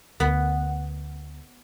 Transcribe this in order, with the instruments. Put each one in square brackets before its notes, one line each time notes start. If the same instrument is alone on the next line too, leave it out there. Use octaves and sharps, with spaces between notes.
[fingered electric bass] D2 [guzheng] B3